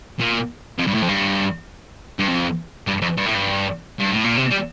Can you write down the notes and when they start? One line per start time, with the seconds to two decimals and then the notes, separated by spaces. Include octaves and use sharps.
0.19 A#2
0.78 F2
0.87 G2
0.94 A2
1.02 F2
1.09 G2
2.19 G2
2.28 F2
2.87 G2
3.02 F2
3.17 G2
3.26 A2
3.35 G2
4.00 G2
4.12 A2
4.24 A#2
4.37 C3
4.51 G3